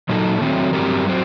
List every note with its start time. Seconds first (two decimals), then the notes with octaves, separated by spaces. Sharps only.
0.09 A#2 F#3 A#3 D#4 A4
0.41 D#3 F#3 A3 C4
0.73 G2 F#3 C4 G4 A#4
1.07 F#3 C4